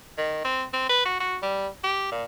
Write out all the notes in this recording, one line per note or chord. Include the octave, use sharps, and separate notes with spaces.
D#3
C4
C4
B4
F#4
F#4
G3
G4
A#2